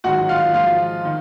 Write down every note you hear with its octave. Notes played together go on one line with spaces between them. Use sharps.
G#2 D#3 F#3 F#4 F#5
F4 F5
G#2 F3 F4 F5
D#3